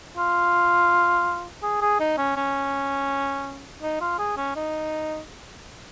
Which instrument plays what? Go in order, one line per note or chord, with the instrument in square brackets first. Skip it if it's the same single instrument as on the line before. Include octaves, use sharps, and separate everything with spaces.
[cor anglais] F4
G#4
G#4
D#4
C#4
C#4
D#4
F4
G#4
C#4
D#4